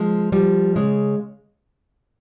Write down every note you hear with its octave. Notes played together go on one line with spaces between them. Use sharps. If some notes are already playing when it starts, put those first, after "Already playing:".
Already playing: F3 G#3
F3 G3
C#3 G#3